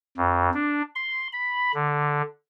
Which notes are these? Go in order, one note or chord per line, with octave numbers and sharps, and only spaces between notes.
F2
D4
C6
B5
D3